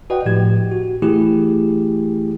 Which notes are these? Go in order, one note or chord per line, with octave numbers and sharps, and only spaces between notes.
F#4 B4 D5 D#5 F#5 G5
A2 F3 G4 G#6
F#4
E3 A3 E4 G4 G#4